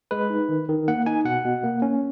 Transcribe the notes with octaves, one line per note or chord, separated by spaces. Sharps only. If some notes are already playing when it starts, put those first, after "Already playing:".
G#3 B4
D#4
D#3
D#3
A#3 F#5
D#4 G#5
B2 F#5
B2
A#3
C#4